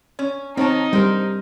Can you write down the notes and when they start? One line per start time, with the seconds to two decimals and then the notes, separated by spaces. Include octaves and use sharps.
0.19 C#4
0.57 D#3 C4 D#4 C#5 A5
0.93 G3 A#4 C5